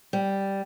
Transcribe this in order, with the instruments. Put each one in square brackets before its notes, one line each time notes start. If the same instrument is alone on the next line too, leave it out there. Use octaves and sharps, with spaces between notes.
[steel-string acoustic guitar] G3